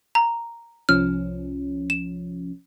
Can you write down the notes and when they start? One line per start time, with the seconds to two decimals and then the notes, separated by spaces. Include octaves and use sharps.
0.15 A#5
0.89 C2 F3 C#4 F6
1.90 E7